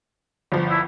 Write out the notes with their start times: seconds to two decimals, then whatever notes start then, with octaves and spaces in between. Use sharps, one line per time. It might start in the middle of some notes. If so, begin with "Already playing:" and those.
0.52 G1 F3
0.70 E4